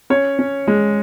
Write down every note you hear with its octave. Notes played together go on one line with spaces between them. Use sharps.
C#4 C#5
C#4
G#3